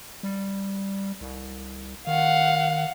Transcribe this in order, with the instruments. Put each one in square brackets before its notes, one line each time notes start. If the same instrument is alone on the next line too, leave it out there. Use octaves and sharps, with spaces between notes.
[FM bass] G3
C2
[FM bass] D#3 [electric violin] F5 F#5